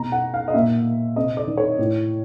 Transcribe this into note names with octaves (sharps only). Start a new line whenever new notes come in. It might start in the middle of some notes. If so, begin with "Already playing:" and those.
Already playing: B2 A#5
F#5
F5
D#5
A#2 E5
C3 D#5
D5
D#3
C#5
A2